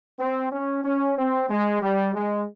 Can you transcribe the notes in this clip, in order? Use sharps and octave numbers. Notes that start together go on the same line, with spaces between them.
C4
C#4
C#4
C4
G#3
G3
G#3